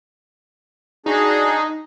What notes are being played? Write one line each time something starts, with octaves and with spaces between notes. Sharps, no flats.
D4 D#4 F#4 G#4